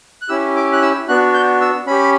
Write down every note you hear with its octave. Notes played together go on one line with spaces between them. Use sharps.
F#6
C#4 E4 G4 E6
D6
F#6
E6
B3 D4 F#4 F#6
G6
E6
C#4 G4 B5